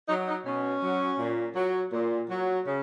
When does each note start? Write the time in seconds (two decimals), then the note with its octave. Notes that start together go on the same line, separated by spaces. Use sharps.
0.08 F#3 D#4
0.28 D#4
0.45 B2 C#4
0.82 F#3
1.19 A#2
1.55 F#3
1.93 A#2
2.30 F#3
2.66 C#3